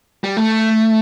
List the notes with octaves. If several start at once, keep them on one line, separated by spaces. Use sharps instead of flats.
G3
A3